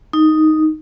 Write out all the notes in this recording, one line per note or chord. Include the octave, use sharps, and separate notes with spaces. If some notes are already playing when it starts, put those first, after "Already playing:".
D#4